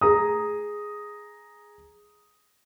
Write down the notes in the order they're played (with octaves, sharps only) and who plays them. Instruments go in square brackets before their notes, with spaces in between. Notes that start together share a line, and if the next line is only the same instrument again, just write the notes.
[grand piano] G#4 A#5 D#6